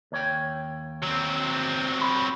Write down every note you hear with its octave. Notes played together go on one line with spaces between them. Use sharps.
D#2 C#5 G5
F#3 C4
B5